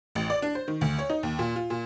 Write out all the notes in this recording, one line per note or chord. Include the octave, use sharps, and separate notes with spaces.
A1
D5
D4
C5
D#3
D2
C#5
D#4
D#2
A#2
F4
A#2